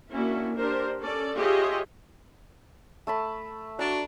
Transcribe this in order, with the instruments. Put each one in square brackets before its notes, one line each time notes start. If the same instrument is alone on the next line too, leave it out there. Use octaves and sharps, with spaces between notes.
[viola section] A#3 C#4 D4 E4 F#4
D4 G4 A#4 C5
C#4 A4 D5
F4 G4 G#4 C#5 D#5 E5
[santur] A3 A5 B5
[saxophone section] D4 F#4 [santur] A#5